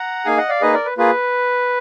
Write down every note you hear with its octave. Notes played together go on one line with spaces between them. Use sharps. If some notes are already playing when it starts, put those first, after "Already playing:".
Already playing: F#5 A#5
A#3 D#4 G#4 F5 G#5
D#5 F#5
D5 F5
A#3 D#4 G#4 B4 D#5
A#4 D5
B4
A#3 F4 G#4 B4